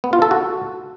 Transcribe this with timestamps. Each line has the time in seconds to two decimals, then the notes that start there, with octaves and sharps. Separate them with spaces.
0.04 B3
0.13 F4
0.22 A4
0.31 F#4